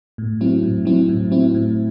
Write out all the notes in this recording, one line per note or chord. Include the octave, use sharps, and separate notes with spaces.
A2
F#3 C4 E4
A2
F#3 C4 E4
A2
F#3 C4 E4
A2